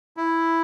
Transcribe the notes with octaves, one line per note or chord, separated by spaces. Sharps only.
E4